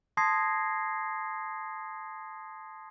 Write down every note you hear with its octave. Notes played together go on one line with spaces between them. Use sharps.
A5 C6 D#6 G#6 A#6 C7